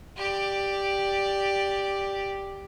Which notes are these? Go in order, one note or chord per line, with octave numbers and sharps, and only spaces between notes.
G4 D5